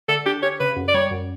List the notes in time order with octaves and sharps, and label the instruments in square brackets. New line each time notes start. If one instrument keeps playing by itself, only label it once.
[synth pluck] D3 [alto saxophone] A4
[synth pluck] D4 [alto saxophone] G4
[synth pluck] G4 [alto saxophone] C#5
[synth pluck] C#3 [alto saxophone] B4
[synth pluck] F#2
[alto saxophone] D5
[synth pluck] G3 [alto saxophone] C#5
[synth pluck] F#2